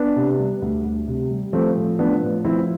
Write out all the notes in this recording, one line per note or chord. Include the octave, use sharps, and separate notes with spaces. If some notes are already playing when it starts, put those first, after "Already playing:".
Already playing: B3 D4
C3
G3
D2
D2
C3
G3
F3 A3 C4
A2
F3 B3 D4
A2
F3 C4 E4